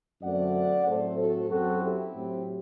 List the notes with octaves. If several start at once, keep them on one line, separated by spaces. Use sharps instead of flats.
F#2 D3 A3 C4 D5 F#5
A2 F#3 A3 C4 A4 C5
F#4 A4
F#2 F#3 C4 F#4 A4
E4 G4
A2 F#3 C4